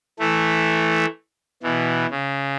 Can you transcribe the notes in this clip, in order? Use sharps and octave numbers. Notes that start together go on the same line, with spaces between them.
E3 A3
B2 E3
C#3